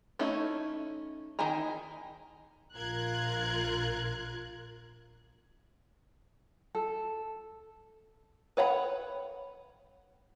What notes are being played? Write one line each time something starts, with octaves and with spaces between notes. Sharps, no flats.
A3 C#4 D#4 E4
D#3 D#4 E4 G#5 A#5
A#1 F4 A#4 F#6 G#6
A4
B4 C#5 F#5 B5